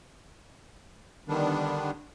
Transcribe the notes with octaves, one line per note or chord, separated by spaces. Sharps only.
D3 D#3 G3 B3 D4